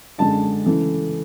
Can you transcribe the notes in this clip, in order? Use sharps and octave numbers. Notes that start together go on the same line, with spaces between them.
F#2 D3 G#3 D4 A5
C#3 E3 A3